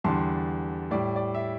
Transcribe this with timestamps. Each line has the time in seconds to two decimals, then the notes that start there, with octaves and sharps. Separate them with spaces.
0.04 E2 D3 G3 A5 C6
0.91 A2 G3 D5
1.16 D5
1.35 E5